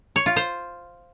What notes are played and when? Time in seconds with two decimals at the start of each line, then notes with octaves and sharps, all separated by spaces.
0.16 C#5
0.26 F4
0.36 C5